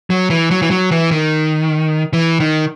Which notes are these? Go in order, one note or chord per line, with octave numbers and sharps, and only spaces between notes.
F#3
E3
F#3
E3
F#3
E3
D#3
E3
D#3